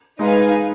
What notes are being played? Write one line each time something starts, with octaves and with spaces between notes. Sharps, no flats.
G#3 D#4 B4 F5 G#5